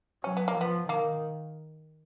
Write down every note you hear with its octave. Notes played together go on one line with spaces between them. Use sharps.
F#3 C#4
B3
A#3
F3 B3
D#3 A#3